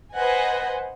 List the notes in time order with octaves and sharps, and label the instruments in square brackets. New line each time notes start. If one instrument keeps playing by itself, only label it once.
[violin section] B4 C5 D#5 F#5 G#5